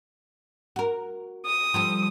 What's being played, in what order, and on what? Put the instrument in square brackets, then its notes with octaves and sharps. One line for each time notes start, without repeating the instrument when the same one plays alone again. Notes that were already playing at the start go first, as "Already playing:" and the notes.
[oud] F#4 A#4
[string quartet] D#6
[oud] F3 G3 A4